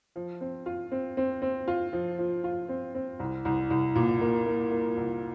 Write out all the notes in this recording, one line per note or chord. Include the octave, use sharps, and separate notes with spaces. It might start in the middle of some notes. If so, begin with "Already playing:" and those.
F3
C4
F4
C4
C4
C4
F4
F3
F3
F4
C4
C4
C2
C2
C2
A#2
A#3
A#3
A#3
C2